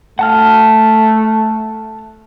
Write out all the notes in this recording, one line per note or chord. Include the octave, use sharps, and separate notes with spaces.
A3 F#5 A5 F6